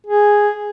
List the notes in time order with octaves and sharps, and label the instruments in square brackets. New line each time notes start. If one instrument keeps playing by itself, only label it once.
[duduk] G#4